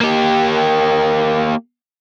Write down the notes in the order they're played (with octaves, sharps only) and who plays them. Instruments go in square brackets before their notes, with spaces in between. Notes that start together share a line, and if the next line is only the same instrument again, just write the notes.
[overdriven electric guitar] A#3 G4